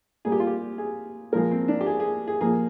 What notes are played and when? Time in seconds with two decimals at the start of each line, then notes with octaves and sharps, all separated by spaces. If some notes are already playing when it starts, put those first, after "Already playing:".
0.25 A#2 G3 A#3 G#4
0.32 G4
0.40 F4
0.47 G4
0.78 G#4
1.32 A#2 F3 G#3 A#4
1.51 C4
1.68 D4
1.81 G4
1.86 G#4
2.00 G#4
2.28 G#4
2.41 A#2 F3 A#3 G#4